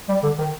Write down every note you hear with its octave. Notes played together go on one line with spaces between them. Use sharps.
G3
D3
D#3